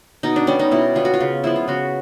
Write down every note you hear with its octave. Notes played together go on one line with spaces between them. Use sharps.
B2 D#4
D4
G3 B3 C#4
D#4
B2 E4
G3 B3 F4
F#4
F4
C#3
F3 G#3 B3 E4
F4
C#3 F#4